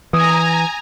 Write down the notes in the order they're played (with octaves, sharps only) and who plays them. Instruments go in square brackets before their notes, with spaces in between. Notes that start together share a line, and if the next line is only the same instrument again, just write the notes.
[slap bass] E3 [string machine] G#5 A#5 [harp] D#6